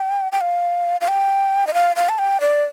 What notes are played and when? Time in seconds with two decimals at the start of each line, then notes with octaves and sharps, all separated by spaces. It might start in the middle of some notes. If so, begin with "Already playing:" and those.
Already playing: G5
0.32 G5
0.41 F5
1.01 F5
1.08 G5
1.67 D#5
1.74 F5
1.96 F5
2.09 A5
2.18 G5
2.41 D5